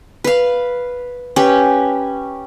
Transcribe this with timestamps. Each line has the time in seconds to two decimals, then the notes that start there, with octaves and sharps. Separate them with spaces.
0.24 B4 F5
1.36 C#4 G4 B4